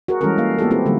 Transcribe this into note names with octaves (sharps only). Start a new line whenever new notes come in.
F#4 G#4 A#4
E3 G3 G#3 C#4 A4 A#4
A#3 F5
A#3 B3 F4 G4 A4
C4 E4 G4 A4
D3 F#3 G3 A3